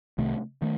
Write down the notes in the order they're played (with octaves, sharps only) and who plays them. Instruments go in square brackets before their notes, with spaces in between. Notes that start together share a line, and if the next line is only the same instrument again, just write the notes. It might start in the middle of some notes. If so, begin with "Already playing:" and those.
[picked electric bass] C2 C3 D#3 A3
D#3 A3